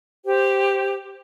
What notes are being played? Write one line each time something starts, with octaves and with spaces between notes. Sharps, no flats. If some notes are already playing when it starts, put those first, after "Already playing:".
G4 C5 G5